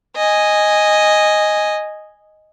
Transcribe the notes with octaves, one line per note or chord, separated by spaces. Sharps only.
D#5 G#5